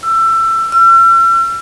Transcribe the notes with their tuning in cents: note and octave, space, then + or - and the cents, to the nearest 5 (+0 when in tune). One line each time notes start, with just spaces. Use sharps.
E6 +25
E6 +45